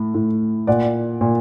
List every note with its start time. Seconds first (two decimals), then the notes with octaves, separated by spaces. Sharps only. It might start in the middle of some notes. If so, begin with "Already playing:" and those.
Already playing: A2
0.14 A2
0.67 A#2 D5 F#5
1.21 A#2